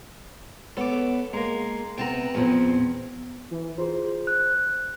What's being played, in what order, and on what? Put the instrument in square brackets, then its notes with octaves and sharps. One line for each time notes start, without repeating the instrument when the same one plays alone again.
[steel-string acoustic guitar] B3 C#5 [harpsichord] A4 D6
[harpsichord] G#3 A#3 [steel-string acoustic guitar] A#5
[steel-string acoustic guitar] C3 B3 B4 [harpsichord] G5 A5 A#5
[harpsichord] E2 [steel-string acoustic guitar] A#2 F3 C4
[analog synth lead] E3
[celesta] F4 G#4 [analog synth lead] C5
[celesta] F#6